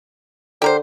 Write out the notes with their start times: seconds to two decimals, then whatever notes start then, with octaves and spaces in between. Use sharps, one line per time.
0.62 D3 G4 A#4 C5